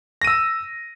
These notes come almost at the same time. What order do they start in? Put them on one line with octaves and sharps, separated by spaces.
A#6 D#7 E6